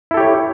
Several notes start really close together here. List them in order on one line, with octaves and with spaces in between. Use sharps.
E4 A4 G4 C#5